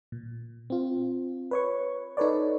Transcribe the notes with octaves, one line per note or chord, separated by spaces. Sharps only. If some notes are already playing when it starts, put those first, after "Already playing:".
A#2
C4 F4
B4 C#5 C#6
D#4 A4 B4 C#5 D5